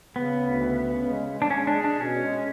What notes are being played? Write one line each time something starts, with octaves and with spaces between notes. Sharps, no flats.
C#3 B3
D2
C#3
C#3
G#3
G#3
D4
G#3 C#4
D4
G#4
D4
B2 C#4
G#3